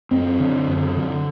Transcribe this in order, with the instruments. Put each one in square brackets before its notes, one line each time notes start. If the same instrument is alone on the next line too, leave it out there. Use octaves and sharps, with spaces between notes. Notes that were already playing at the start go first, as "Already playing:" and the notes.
[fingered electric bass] F#2 C4
D3
F#2
D3